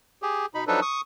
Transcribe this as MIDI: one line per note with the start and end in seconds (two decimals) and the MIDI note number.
0.22 0.46 67
0.22 0.46 68
0.55 0.64 47
0.55 0.64 63
0.55 0.64 83
0.67 0.80 53
0.67 0.80 54
0.67 0.80 62
0.67 0.80 63
0.67 0.80 69
0.67 0.80 71
0.82 1.01 85
0.82 1.01 87